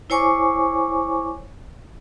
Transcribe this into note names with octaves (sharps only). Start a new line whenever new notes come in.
E4 C5 C#5 G#5 C#6 D6